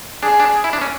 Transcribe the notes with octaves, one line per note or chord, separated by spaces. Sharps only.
D4 G#4
D4
E4
D4
C#4